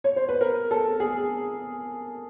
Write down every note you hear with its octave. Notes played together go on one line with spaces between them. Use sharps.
C#5
C5
B4
A#4
A4
G#4